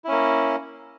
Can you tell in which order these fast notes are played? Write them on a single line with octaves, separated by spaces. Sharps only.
E4 C#4 A#3